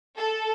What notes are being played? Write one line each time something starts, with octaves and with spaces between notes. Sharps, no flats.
A4